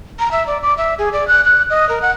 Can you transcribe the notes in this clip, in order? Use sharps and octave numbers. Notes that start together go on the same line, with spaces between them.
A#5
E5
D5
D6
E5
G#4
D5
F#6
F#6
D#5
A#4
F#5